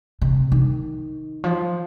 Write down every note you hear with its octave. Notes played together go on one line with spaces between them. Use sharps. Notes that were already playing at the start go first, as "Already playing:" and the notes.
C3
D#3
F3